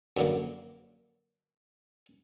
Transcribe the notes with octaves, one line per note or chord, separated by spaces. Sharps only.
F#2 D3 A#3